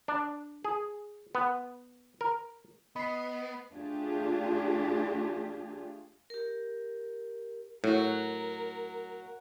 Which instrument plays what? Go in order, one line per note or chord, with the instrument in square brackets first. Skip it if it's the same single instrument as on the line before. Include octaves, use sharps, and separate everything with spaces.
[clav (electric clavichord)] D4
G#4
B3
A#4
[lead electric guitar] B3 [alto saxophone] D#5 [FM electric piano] B5 C7
[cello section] A3 D4 F4 G4 G#4
[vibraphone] G4 A#4
[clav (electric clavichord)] A2 [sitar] F#3 [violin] A#4